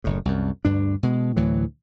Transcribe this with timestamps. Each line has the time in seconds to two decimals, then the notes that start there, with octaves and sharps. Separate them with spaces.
0.04 F#1 A2
0.25 C2 F#2
0.65 D2 G2 D4
1.03 B2 G#3
1.36 D2 A2 E3 F#3